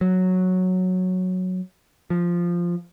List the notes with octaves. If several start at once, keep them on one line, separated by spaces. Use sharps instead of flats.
F#3
F3